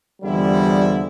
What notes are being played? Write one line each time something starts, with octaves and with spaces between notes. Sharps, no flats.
E2 D3 F3 G3 G#3 E4